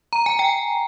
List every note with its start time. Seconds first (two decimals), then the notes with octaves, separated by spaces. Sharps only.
0.13 A#5
0.26 G#5
0.39 G5